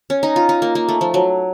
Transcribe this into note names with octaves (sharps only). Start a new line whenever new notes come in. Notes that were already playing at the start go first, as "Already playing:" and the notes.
C#4
D#4
F4
D#4
A#3
A#3
A3
F3
F#3